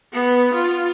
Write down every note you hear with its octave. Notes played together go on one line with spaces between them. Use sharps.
B3
F4